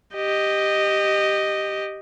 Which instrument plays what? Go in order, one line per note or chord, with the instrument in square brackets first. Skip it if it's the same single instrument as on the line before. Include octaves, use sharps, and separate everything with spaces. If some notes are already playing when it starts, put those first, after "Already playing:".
[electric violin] G4 D#5